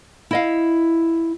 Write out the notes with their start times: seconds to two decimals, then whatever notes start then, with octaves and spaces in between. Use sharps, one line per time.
0.31 E4 D#5 F5